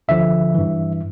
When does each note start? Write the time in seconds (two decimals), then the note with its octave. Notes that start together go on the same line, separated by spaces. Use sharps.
0.08 D2 D3 F3 E5
0.54 G2 E3